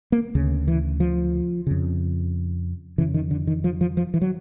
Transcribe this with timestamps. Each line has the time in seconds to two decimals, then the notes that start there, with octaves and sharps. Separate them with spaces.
0.12 A#3
0.35 D2 C#3
0.68 E3
1.00 F3
1.67 F2 C#3
2.98 C#3 E3
3.01 F2
3.14 D#3
3.31 D3
3.47 D#3
3.64 F3
3.81 F3
3.97 F3
4.14 E3
4.22 F#3